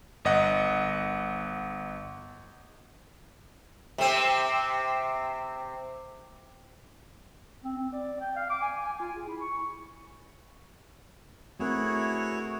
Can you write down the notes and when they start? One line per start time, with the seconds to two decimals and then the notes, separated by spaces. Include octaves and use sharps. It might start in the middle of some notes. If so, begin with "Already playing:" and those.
0.25 G1 D#5 F#5
3.98 C3 C4
7.64 C4
7.78 C4
7.93 D5
8.20 G5
8.36 F5
8.50 D6
8.61 G#5
8.86 G#5
9.00 F4
9.16 G#4
9.27 E4
9.40 C#6
11.60 A3 C4 E4 F#4 G#4 A#4 C#5